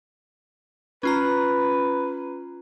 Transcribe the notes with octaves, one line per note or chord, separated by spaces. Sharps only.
C#4 F4 B4 A#5